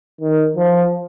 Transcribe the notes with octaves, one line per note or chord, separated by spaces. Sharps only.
D#3
F3